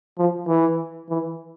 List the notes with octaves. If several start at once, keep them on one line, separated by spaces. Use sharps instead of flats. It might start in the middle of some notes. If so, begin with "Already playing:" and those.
F3
E3
E3